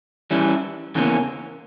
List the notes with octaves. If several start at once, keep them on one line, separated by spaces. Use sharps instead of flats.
E3 G3 C#4 E4
E2 C#3 E3 A#3 C#4